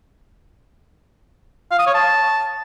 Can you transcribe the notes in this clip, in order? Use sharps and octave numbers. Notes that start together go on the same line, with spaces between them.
F5
D#6
C#5
A5